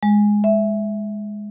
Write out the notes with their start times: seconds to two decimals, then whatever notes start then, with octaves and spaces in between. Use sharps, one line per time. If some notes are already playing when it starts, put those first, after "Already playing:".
0.03 G#3
0.44 E5